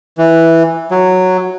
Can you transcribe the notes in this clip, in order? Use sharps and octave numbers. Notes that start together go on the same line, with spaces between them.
E3
F#3